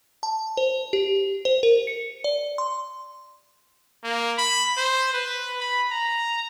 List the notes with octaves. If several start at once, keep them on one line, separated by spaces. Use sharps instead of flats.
A5
C5
G4
C5
A#4
C#7
D5
C6
A#3
B5
C5
B4
B5
A#5